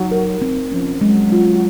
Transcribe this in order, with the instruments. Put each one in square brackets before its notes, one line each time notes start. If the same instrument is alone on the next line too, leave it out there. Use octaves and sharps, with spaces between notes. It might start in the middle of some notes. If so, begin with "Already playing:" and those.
Already playing: [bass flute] F#3 [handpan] D#4
[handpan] A#4
C4
[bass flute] F3 [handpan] C#4
[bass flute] F#3 [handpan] G#3
[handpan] F4